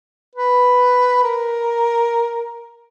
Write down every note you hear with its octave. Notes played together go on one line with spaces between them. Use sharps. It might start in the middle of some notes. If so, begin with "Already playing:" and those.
B4
A#4